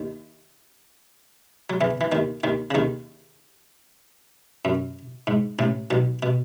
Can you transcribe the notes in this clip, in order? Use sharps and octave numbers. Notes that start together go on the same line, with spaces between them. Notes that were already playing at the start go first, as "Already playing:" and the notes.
Already playing: D#2 D#3
F#3
E2 E3
E3
D#2 D#3
D#2 D#3
C#3
D#2 D#3
F#2
G#2
A1 A2
B1 B2
B2